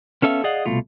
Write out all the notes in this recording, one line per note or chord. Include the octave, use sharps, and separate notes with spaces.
B3 C#4 A4 E5 F5
G#4 D5 D#5 F5 F#5
C2 B2 A3 F4